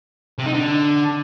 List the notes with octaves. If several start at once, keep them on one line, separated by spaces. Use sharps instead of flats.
C3
D#4
D3